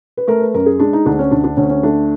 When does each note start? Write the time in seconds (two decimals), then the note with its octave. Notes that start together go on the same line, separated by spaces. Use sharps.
0.17 B4
0.27 A3 A#4
0.41 B4
0.54 F#2 A#4
0.66 G#4
0.79 G#3 D4
0.93 D#4
1.06 D2 D4
1.19 C#4
1.31 D2 D4
1.44 D4
1.57 D2 C#4
1.70 C#4
1.83 A3 D4